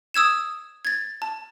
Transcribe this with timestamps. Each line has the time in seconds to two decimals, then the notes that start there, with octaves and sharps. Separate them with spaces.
0.14 D#6 E6 G#6 E7
0.85 G#6 A6
1.22 A5